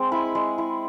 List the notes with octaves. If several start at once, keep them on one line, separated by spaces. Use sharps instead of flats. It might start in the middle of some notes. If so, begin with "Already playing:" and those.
Already playing: G#3 C4
E4 B5
G#3
E4